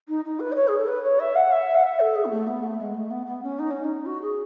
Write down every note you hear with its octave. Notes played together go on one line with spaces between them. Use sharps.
D#4
D#4
B4
D#5
C#5
G#4
A4
B4
C#5
E5
F#5
E5
F#5
E5
A4
G#4
B3
A3
B3
A3
G#3
A3
B3
B3
C#4
D#4
C#4
D#4
F#4
G#4